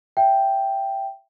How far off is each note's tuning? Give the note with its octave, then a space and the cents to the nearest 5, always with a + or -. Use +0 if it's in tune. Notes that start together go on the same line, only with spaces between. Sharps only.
E5 +20 G5 +0